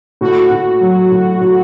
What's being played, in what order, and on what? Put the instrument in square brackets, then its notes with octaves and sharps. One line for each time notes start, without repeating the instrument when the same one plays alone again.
[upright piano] A2 [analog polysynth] F#4
[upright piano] A2
F#3
A2
A2